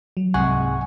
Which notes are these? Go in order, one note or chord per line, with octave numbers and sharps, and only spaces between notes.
F#3
C2 G#2 C3 G#3 F#5 G#5 C#6